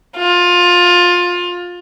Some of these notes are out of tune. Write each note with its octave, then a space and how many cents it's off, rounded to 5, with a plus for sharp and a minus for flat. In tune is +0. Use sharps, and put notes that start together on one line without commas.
F4 +20